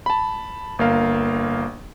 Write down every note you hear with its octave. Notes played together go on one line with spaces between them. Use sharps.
A5 B5
G1 A#3 F5